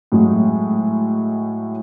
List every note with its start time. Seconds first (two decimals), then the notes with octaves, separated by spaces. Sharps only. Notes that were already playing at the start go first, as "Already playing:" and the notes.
0.12 A2 F#3 G#3